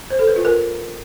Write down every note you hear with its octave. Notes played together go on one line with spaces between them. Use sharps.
C5
A4
B4
F4
A#4